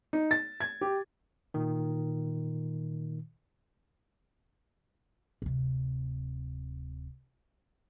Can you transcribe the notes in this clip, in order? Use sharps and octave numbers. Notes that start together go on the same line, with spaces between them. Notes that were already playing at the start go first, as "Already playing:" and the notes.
D#4
A6
G#6
G4
A#2 D#3
D1 C3